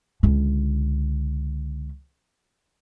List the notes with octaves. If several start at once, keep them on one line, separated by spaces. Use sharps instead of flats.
C#2 D3